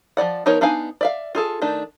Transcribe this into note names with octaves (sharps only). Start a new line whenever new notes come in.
F3 F#3 D5 F#5
F3 B3 D#4 A#4 C#5
B3 D4 D#4 F5 G#5
D5 E5 F5
F4 G#4 A4
D#3 A3 D4